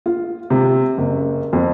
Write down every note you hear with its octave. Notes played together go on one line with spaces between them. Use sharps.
F4
C3
F#1
F2